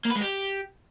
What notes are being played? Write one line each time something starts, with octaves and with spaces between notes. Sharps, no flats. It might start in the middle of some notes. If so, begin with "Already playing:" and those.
A#3
B4
G#3
G4